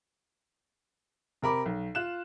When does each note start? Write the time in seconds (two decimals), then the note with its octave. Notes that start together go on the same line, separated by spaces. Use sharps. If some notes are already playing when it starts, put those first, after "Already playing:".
1.42 C3 A#4 B5 D6
1.66 B1
1.95 F4 F#6 E7